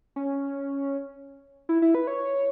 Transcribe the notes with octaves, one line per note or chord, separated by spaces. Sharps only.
C#4
E4
E4
B4
C#5